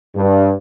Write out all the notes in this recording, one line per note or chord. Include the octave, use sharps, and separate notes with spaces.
G2